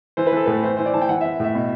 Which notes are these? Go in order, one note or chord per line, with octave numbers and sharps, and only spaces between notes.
E3 C5
B4
E3 A4
A2 B4
E3 C5
E3 C5
D5
E3 A5
G5
E3 F#5
E5
E3
A2 E5
B2